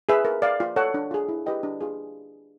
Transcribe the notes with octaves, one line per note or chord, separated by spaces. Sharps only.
G#4 B4 E5
A#4
D5 F5
F4
A4 C#5 F#5
D4
F4 G#4
E4
G4 B4 D#5 G5
D4
F4 G#4